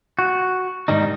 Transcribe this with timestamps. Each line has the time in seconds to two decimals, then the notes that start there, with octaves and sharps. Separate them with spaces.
0.19 F#4
0.88 G#2 D#3 G3 D#4